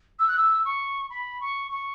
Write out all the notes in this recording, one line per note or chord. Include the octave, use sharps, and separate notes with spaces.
E6
F#6
E6
C#6
B5
C#6
C#6